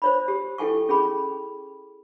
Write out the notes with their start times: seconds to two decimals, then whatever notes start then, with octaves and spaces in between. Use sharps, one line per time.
0.02 C5 C#5 B5
0.28 G4
0.58 E4 A4 G5 G#5 C#6
0.89 C#4 G#4 G5 B5